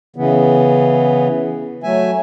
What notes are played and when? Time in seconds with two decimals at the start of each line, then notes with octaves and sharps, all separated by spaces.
0.16 C#3 E3 B3
1.84 F#3 A3 E5 G#5